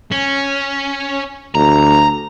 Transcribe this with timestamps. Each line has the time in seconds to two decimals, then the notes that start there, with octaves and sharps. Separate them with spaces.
0.12 C#4
1.55 D2 A#5